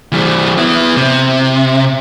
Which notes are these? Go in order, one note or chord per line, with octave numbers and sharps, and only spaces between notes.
E3 G3
B3 E4
C3